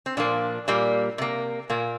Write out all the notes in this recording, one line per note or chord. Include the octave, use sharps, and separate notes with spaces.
C4
A#2 F3 A#3 D4
A#2 G3 A#3
C3 A#3
A#2 A#3